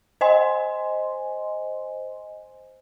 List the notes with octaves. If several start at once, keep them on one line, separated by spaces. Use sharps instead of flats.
C5 D#5 G#5 C6